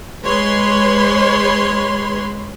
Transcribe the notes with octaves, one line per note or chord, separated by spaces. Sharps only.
G#3 B4 C#5 B5 C6